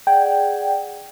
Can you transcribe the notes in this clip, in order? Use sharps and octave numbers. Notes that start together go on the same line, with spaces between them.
G#4 D5 F#5 G5